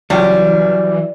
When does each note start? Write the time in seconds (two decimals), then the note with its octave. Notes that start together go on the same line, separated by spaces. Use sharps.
0.10 C#2 E3 F#3 G3 C#4